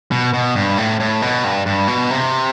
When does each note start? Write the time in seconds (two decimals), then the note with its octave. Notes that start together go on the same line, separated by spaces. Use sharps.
0.11 B2
0.34 B2
0.55 G2
0.78 A2
1.00 A2
1.22 B2
1.44 G2
1.66 G2
1.88 B2
2.11 C3